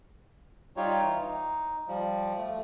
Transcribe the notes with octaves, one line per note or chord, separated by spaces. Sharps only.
G3 D#4 F4 G4 C#5
E3
D#4
F3 G3
A3